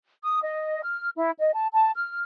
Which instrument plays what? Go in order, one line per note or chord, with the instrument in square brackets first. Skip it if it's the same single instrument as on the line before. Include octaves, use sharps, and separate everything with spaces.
[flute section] D#6
D#5
F6
E4
D#5
A5
A5
F6